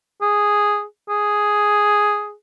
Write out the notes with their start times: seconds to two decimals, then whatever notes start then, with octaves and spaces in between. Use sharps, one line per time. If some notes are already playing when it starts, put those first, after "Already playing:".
0.22 G#4
1.09 G#4